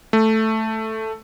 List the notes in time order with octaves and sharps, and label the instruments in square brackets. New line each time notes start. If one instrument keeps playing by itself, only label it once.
[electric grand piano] A3